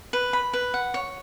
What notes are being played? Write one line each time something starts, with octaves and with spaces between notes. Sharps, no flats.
B4
B5
B4
F#5
C#5